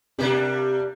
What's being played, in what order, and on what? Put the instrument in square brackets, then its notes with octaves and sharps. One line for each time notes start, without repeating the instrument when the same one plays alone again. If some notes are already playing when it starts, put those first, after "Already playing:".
[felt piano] C3 [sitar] G3 A#3 D4 [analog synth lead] G4